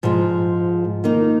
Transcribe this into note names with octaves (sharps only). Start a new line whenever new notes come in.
G#2 F3 G#3
D#3 A#3 D#4